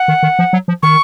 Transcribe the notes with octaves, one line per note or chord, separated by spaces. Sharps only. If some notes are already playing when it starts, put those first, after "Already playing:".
Already playing: F#5
D#3
D#3
F3
F#3
F3
D#3 C#6